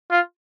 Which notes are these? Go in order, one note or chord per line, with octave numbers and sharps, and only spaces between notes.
F4